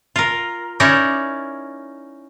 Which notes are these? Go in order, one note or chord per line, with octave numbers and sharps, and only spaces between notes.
F4 A#4
C#4 D#4 E4 A#4 D5